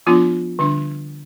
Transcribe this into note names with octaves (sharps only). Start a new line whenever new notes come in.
F3 B3 D4 F4
D3 G3 D4